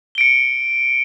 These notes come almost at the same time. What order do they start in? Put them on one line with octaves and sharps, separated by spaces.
G7 D7 C#7